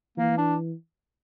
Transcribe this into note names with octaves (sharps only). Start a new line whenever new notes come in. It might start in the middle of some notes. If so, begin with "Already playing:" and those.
E3 A#3
D4